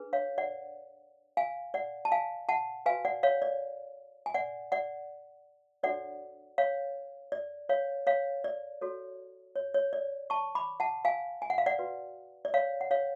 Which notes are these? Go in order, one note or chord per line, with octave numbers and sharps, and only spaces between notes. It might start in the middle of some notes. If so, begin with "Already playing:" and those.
Already playing: D4 G#4 B4
C#5 F5
D5 F#5
F5 G#5
D5 F#5
A5
F5 G#5
F#5 A5
F#4 B4 F5 G#5
D5 F#5
C#5 F5
D5
G#5
D5 F#5
D5 F#5
D4 F#4 A4 C#5 D5 F#5
C#5 F5
D5
C#5 F5
C#5 F5
D5
F#4 A4 C#5
C#5
C#5
D5
A5 C#6
B5 D6
F#5 A5
F5 G#5
G#5
F#5
F5
D5 F#5
F#4 B4
D5
C#5 F5
F#5
C#5 F5